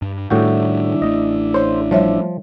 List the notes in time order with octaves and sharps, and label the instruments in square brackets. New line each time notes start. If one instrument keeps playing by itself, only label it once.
[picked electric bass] G2
[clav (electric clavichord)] A2 F#4 G5 [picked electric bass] D#3 G3 [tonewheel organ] D4 E4
[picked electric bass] A1 A3 [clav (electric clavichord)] D#5
[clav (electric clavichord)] C5 [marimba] C#5 C6
[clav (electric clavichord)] F3 [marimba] G3 C#5 E5